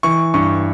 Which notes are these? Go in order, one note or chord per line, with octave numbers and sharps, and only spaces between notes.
E3 C#6
G2 C#6